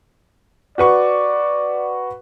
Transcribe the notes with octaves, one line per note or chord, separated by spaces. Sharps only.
F#4 B4 D5 C#6